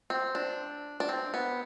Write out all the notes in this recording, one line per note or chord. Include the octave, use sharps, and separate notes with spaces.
C4
D4
D4
C4
B3